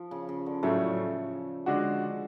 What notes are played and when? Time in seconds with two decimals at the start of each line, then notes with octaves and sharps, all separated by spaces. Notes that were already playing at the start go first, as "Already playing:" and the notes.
Already playing: F3
0.11 C#3
0.29 C#3
0.46 D3
0.63 A2 C#3 F#3 A3 C#4
1.66 D3 G#3 D4 F#4